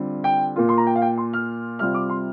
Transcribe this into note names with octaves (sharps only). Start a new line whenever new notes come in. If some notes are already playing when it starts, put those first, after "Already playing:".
Already playing: D3 G3 C4 F4
G5
A#2 A#3 F4
C6
A#5
G5
F5
G5
C6
F6
C3 G3 C4 F4 F6
D6
C6